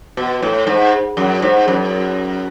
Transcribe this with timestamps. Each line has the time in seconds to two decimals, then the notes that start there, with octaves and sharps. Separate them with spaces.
0.17 B2
0.42 A2
0.67 G#2
1.17 F#2
1.42 G#2
1.68 F#2